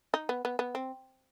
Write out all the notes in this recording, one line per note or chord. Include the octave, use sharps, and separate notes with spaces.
D#4
B3
B3
B3
C4